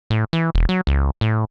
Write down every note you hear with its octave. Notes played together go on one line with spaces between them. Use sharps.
A2
E3
E1
F#3
C#2
A2